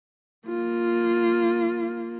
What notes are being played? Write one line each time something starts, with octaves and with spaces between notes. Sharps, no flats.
A#3 F4